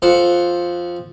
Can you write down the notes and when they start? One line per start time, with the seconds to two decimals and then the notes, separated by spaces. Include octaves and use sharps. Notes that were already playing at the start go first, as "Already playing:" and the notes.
0.02 F2 C5 F#5